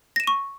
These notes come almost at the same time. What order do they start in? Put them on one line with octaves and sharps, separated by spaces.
A#6 E7 D#7 C#6